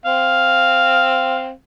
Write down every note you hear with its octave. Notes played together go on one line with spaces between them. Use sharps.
C4 F5